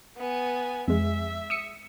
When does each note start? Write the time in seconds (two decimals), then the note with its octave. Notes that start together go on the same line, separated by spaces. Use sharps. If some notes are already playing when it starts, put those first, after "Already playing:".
0.17 B3 G#5
0.88 F2 G#3 E5
1.50 D#6 E6 C#7